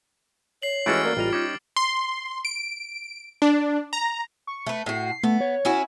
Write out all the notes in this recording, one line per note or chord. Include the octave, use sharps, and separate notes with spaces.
C#5 C7 F#7
E3 G#3 A3 C#4 F#4 F6 A6 D7
A#3 D5
A1 G3 F4 D#5 A#5
C#4 D#4 D6
C6
D7
D4
A#5
C#6
A3 B4
A2 F#4 C7
A3 B3
C#5
C#4 E4 F#4